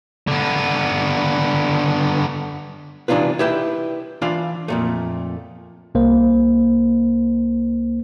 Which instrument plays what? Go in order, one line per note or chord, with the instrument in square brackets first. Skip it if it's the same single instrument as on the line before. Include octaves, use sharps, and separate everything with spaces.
[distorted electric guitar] D3 B3
[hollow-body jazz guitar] C3 E3 D4 D#4 F4 B4
E4 G4 B4 E5 G5
E3 D4 F4 F5 B5
F2 A#2 A3
[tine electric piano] C2 A#3 C5